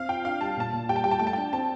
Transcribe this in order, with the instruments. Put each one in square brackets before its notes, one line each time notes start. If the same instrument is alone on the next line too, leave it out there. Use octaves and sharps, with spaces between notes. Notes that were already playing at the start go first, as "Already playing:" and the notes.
Already playing: [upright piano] C4 [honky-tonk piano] F5
[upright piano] F4 [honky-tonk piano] G5
[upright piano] D4 [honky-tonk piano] F5
[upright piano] G3 [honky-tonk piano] A5
[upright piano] A#2 [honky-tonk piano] A5
[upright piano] A#2
[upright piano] G3 [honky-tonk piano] G5
[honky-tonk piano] A5
[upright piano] G3 [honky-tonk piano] G5
[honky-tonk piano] A5
[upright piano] A3 [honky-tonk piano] G5
[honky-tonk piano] A5
[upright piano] D4 [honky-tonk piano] G5
[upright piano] C4 [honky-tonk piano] A5